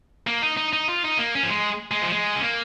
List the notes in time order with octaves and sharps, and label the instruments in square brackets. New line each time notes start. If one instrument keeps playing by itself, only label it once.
[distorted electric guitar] A#3
D#4
D#4
D#4
F4
D#4
A#3
C#4
F3
G#3
G#3
F3
G#3
C#4
A#3